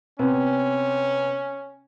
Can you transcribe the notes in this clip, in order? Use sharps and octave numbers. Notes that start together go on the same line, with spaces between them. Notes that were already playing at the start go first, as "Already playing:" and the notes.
C3 B3 C#4